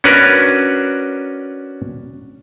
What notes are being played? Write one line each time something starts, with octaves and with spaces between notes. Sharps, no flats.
C#4 D4 F#4 A#4 B4